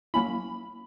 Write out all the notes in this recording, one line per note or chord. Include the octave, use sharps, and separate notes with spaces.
F#3 A#3 C#4 E4 B5